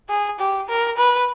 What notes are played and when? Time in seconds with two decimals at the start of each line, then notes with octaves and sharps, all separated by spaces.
0.09 G#4
0.39 G4
0.69 A#4
0.97 B4